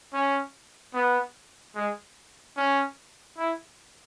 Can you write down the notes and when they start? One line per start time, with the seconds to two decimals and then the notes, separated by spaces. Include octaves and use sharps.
0.13 C#4
0.94 B3
1.76 G#3
2.57 C#4
3.38 E4